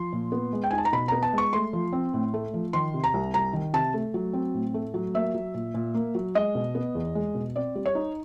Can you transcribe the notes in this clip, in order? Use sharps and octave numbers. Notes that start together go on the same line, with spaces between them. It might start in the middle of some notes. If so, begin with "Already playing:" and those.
Already playing: F3 C6
A#2
B3
G#3
G5
D#4 G#5
A5
A#5
B2 B5
B3 A#5
A5
G#3 C#6
A3 C6
F3
C4
A2
A3
F3
D#3 C6
C3
A#5
C2
C2 A#5
D#3
C3 A5
A3
F#3
C4
A2
A3
F#3
A#3 E5
F#3
A#2
A#2
A#3
F#3
G#3 D#5
B2
B3
E2
G#3
B2
C4 D5
G3
C#5
D#4